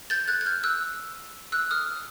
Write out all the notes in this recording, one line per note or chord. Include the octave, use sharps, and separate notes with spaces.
G6 A6
F#6 G#6
G#6
F6 G6
E6 F#6
E6 F#6
D#6 F6